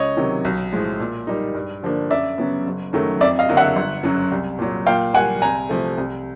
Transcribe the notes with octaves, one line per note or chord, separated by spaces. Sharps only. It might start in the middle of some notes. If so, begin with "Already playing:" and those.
Already playing: C#2 C#5 D#5
C3 D#3 F#3
B1
A2 F3 G#3
A#2
G3 A#3 D#4
G2
D3 F3 A#3 D4
F#2 D5 E5
C#3 F#3 B3
F#1
F#2 D#3 F#3 A3
F2 D5 E5
D#5 F5
D3 F#3 A#3 D4
E5 F#5
G1
F#2 C#3 F#3
C2
A#2 F#3
A#2 F5 G5
G3 A#3 F#5 G#5
C2 G#5 A#5
C3 F3 A3
C2